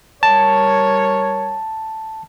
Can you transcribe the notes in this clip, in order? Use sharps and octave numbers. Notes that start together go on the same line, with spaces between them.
G3 A#4 C#5 A5